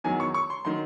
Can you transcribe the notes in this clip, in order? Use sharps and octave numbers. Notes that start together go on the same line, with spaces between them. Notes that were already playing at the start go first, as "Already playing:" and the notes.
E2 D#3 F#3 G#5
C#6
C#6
C6
D#3 F#3 C6